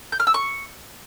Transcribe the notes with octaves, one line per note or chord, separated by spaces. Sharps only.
G6
F6
E6
C#6